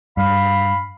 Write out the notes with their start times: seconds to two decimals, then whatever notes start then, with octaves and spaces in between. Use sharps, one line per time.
0.17 G2 F5 B5